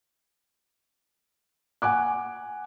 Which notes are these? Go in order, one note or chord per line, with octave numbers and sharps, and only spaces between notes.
F#5 G#5 D6 F#6